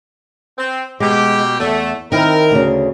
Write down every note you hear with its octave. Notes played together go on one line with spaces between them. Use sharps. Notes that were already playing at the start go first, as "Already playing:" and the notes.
C4
B2 G#3 G4
E2 A3
D#3 C4 E4 A#4
D2 C#3